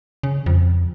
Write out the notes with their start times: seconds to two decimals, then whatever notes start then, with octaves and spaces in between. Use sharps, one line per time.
0.23 C#3
0.46 F2